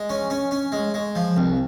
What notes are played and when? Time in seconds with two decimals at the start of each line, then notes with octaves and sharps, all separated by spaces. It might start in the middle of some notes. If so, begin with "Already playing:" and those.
Already playing: G#3
0.09 C#4
0.30 C#4
0.51 C#4
0.72 G#3
0.94 G#3
1.15 F3
1.36 C2